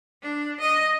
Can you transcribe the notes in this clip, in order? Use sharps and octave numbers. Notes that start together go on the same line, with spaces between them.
D4
D#5